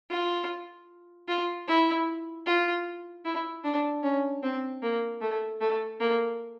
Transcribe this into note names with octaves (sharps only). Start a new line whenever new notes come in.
F4
F4
E4
F4
E4
D4
C#4
C4
A#3
A3
A3
A#3